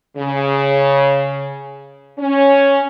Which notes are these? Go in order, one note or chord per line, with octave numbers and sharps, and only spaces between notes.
C#3
C#4